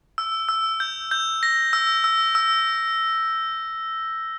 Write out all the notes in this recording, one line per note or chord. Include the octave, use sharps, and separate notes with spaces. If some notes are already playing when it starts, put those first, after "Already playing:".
E6
E6
G6
G6
A#6
E6
E6
E6